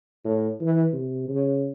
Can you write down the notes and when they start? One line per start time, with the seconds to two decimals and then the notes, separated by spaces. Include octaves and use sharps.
0.24 A2
0.60 E3
0.93 C3
1.29 C#3